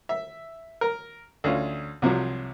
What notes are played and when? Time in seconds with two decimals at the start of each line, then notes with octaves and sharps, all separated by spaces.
0.09 E5
0.81 A#4
1.44 D2 C#4 F4
2.02 C2 C3 F3 F#3